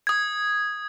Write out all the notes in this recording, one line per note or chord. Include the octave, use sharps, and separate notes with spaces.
D#6 G#6